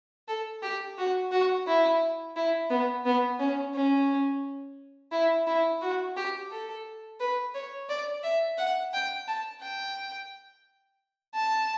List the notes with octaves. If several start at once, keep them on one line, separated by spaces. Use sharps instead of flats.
A4
G4
F#4
F#4
E4
E4
B3
B3
C#4
C#4
E4
E4
F#4
G4
A4
B4
C#5
D5
E5
F#5
G5
A5
G5
A5